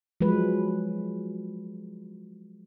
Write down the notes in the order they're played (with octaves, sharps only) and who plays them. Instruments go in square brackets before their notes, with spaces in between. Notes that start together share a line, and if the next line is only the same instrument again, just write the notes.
[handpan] F3 F#3 G#3 B4